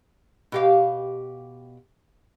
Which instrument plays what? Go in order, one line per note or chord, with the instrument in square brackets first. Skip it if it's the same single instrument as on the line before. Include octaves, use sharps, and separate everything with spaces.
[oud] B2 G4 F5